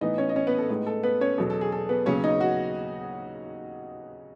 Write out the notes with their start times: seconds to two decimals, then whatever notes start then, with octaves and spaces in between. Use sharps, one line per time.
0.01 A2 E3 B3 D#4 D#5
0.18 C#4 C#5
0.29 D#5
0.36 C#4 C#5
0.47 B3 B4
0.58 A4
0.69 A2 G#3 B3 D#4
0.87 A4
1.03 B3 B4
1.21 C#4 C#5
1.38 E2 B2 F#3 B3 A4
1.50 A4
1.61 G#4
1.72 A4
1.89 B3 B4
2.06 D#2 C#3 F#3 B3 C#4 C#5
2.24 D#4 D#5
2.40 F#4 F#5